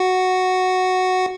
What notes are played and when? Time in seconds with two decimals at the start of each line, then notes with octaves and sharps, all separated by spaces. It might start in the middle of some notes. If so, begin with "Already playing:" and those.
Already playing: F#4